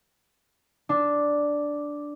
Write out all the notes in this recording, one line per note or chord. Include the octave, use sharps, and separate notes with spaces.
D4